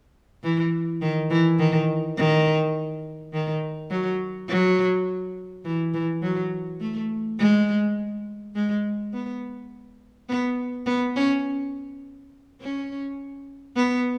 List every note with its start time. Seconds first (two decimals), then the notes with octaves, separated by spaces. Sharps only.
0.43 E3
1.02 D#3
1.30 E3
1.59 D#3
2.17 D#3
3.34 D#3
3.91 F#3
4.48 F#3
5.65 E3
5.94 E3
6.22 F#3
6.80 A3
7.39 G#3
8.55 G#3
9.13 B3
10.29 B3
10.86 B3
11.16 C#4
12.62 C#4
13.76 B3